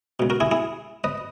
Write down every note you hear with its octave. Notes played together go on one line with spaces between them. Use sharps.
C#2 B2
F#4 A#4
E4 G#4
E4 G#4
B4 D#5